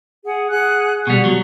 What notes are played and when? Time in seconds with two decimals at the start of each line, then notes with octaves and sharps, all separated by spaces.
0.24 G#4 F#5
0.49 G#4 F#5 F#6
1.07 B2 G3 F#5
1.25 F#3 C#6